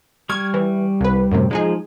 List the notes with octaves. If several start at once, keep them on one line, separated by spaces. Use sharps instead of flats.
G3 C#6 F6 G#6
E3
C2 B4
F#2 A2 C3
F3 G#3 D#4 G#4